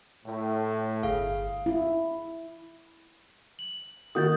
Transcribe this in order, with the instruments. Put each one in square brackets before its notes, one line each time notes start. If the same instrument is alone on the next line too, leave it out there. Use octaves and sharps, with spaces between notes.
[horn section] A2
[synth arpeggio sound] G1 [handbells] G#4 F5
[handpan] E4
[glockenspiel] F#7
[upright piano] D#3 A#3 F#4 [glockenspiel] D#6 G6 A6